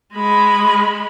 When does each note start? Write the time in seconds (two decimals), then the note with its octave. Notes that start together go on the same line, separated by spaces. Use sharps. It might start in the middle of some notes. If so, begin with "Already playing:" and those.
0.14 G#3 B5